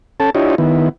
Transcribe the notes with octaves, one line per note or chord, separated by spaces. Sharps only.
C#4 A4 A5
D4 E4 F4 G4 C#5 D#5
D#3 B3 E4